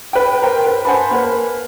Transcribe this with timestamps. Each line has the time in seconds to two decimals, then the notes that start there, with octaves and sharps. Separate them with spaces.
0.13 B4 G5
0.42 A#4 C5 G5
0.66 B4
0.85 C5 F#5 G#5 A5 B5
1.11 A#3 B4